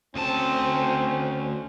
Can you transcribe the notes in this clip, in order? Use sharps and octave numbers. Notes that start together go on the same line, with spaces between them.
D2 C4 C#4 A5